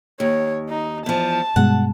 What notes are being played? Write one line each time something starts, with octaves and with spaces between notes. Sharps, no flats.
D#2 C#5
D#4
E2 F3 A5
G2 B2 G#3 F#5